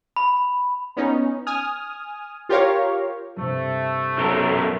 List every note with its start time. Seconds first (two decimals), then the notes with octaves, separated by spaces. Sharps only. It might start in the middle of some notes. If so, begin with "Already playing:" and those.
0.16 B5
0.97 B3 C#4 D#4
1.47 G#5 D#6 F6
2.49 F4 G4 A#4 C#5 F5
3.37 G2 C3 A3
4.18 B1 F#2 A4 A#4